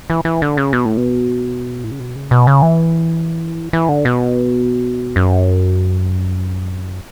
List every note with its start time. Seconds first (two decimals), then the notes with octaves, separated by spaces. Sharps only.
0.10 E3
0.25 E3
0.42 D3
0.57 C#3
0.73 B2
0.86 A2
0.97 B2
1.84 A2
1.91 C#3
2.00 B2
2.16 C#3
2.31 B2
2.47 C#3
2.62 E3
3.73 E3
3.89 D3
4.05 B2
5.16 F#2